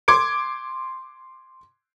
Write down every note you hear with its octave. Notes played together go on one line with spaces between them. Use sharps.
C6 D6 G#6 D7